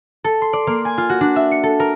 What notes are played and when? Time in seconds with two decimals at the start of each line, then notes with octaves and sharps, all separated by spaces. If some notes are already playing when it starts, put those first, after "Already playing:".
0.24 A4
0.42 C6
0.53 D5
0.67 A#3
0.85 G#5
0.98 F4
1.10 F#4
1.21 D4
1.36 E5
1.51 C#7
1.63 A4
1.80 A#4